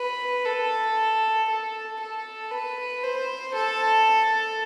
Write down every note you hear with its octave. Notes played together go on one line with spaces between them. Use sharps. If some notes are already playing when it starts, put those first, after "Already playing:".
Already playing: B4
A4
A4
A4
B4
C5
A4